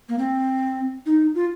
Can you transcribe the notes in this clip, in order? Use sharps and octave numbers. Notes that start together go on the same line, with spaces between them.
A#3
C4
D#4
F4